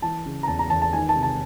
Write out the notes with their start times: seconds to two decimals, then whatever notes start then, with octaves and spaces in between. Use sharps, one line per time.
0.02 E3 A5
0.26 C#3
0.43 A#5
0.48 E2 A5
0.59 A#5
0.70 E2 A5
0.82 A5
0.93 D#3 G#5
1.09 A5
1.16 C3
1.23 A5